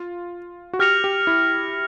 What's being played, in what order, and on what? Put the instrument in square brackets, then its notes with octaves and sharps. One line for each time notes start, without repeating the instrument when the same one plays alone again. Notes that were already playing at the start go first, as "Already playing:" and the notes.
Already playing: [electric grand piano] F4
F#4
[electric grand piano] G4 [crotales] F6 A#6 C#7 F7
[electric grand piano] G4
E4